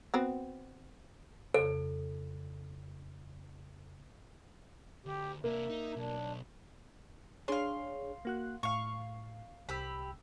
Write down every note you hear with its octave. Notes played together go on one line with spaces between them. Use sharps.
B3 C4 F#4
F2 C#3 A4
D2 G4
C3 A#3 D4 E5
D#4
B1 D4
D4 G#4 C#5 F5 C6
A#3 F#4 F#6
A2 F5 C#6
C2 G4 B5 E6